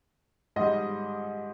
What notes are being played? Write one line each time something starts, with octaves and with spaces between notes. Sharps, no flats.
G#2 G3 D#5